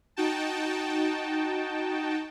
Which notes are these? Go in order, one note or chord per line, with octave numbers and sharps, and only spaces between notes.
D#4 F#4 G5 A5